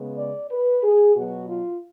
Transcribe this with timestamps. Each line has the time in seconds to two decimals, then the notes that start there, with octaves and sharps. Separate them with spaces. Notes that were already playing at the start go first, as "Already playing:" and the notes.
Already playing: C#3 G#3 B3
0.18 D5
0.51 B4
0.83 G#4
1.16 B2 F#3 B3 F#4
1.48 F4